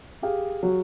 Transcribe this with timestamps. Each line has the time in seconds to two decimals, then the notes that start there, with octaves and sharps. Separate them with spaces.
0.22 G4 G#4 F5
0.63 F#3